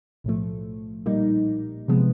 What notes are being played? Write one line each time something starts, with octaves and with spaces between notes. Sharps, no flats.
B1 A2 F3 A3
A#2 G3 A#3 D#4
C3 F3 G#3 B3